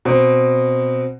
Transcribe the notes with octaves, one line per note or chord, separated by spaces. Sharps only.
B2 C4